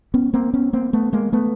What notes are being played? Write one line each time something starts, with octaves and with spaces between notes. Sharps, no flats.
B3 C#4
A#3 C4
B3 C#4
A#3 C4
A3 B3
G#3 A#3
A3 B3